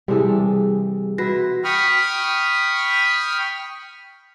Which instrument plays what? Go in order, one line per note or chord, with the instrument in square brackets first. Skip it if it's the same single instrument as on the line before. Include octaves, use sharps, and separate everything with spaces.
[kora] C3 E3 A4 [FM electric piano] G3 G#4
[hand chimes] F#4 A#6 [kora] B4 E5
[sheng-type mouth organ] G5 B5 C#6 D#6 F6